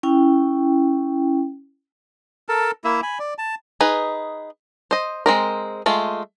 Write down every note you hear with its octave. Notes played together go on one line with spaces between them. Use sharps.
C#4 E4 G5
A4 A#4 A5
A#3 E4 E5
G#5 B5
D5
A5
D#4 G#4 B4
C5 D#5
G#3 C4 A#4
G#3 A3 F4